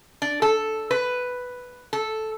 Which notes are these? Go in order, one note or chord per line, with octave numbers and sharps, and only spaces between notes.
D4
A4
B4
A4